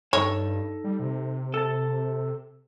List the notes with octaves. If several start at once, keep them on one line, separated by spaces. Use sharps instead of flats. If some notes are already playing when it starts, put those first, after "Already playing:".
G2 D#4 A4 C#5
G3
C3
A4 A5